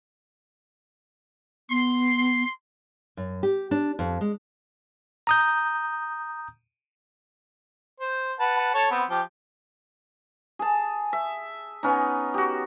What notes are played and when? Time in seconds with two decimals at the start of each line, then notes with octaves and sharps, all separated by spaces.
1.70 B3 C6
3.17 F#2
3.43 G4
3.71 D4
3.99 F2
4.21 G#3
5.27 A#5 D#6 G6
8.00 C5
8.40 B4 F#5 A5
8.74 A4 C#5 A5
8.91 B3 C4
9.10 F3 G4 G5
10.59 G#4 A5
11.13 E5
11.83 B3 C#4 D#4
12.34 F#4 G4